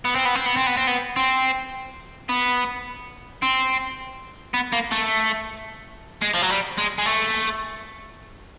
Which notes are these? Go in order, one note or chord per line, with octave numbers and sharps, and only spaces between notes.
B3
C4
B3
C4
B3
C4
B3
C4
B3
C4
B3
C4
B3
A#3
A3
G#3
F3
F#3
G3
G#3
G#3
A3